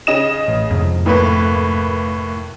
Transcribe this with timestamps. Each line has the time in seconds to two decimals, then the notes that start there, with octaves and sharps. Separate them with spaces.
0.07 C#3 D#5 E7
0.48 A1
0.70 F2 G#2 C3
1.06 A2 A#3 B4